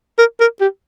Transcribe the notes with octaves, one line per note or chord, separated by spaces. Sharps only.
A#4
A#4
G4